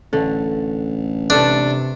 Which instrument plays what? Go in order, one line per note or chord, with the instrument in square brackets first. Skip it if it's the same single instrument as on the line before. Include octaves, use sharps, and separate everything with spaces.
[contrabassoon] A1 [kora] D3 A3
[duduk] C3 [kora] A3 A4 B4 [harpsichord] D4